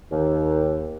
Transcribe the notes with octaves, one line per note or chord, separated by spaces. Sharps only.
D#2